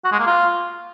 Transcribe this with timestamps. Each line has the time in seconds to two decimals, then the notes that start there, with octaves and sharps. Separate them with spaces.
0.05 F#4
0.12 G#3
0.19 A#3
0.26 F4